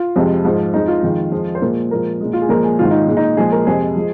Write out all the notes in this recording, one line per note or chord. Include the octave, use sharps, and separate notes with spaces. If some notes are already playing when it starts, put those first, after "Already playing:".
Already playing: F4
F2 C3 G#3
G#2 F3 G#3
F2 F3 G#3 D#4
F4
F2 D#3 G#3
F2 F3 G#3
C5
A#2 F3 G#3 A#4
A#2 F3 G#3 A#4
A#2 G#3
F4
G#4
A#2 F3 G#3 A#4
G#4
G#2 D#3 G#3 F4
D#4
A#2 G#3
D#4
A#2 F3 G#3 G#4
A#4
F2 C3 G#3 G#4
F3 G#3